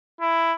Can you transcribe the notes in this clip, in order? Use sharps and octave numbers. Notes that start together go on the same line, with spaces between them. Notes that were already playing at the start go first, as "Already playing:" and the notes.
E4